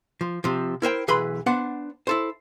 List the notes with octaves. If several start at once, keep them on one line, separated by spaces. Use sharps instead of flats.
F3
C3 F3
E4 A#4 C5 G5
B1 E3 G#4 B4 B5 C6
B3 D4 C5 F#5
E4 A4 C5